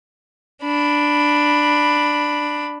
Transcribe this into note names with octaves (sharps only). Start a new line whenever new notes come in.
D4 B5